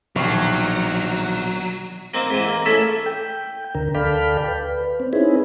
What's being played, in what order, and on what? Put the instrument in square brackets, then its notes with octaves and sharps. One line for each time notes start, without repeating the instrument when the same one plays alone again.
[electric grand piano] A#1 C#6 C7 [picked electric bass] B2 D#3 [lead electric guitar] F#3
[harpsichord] A#3 C4 D#4 C5
G#2 E3
A#3
A3 C#4 E4 A4 E5
[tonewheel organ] G5
D2 D3 A#4
D2 A4 D5 F5 G5 B5
B4
C4
C4 C#4 D#4 E4 G#4 B4